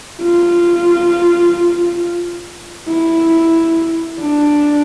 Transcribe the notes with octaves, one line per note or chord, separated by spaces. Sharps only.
F4
E4
D4